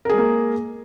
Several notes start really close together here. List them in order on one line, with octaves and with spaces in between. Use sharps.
A#4 G#4 G#3 A#3